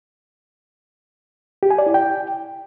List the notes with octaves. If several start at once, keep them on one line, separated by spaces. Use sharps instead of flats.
G4
G#5
D5
E4
G5